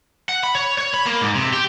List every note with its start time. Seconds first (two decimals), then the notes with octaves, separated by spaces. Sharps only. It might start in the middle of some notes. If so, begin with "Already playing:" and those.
0.29 F#5
0.43 B5
0.55 C#5
0.78 C#5
0.94 B5
1.06 A#3
1.21 G#2
1.36 C3
1.53 G4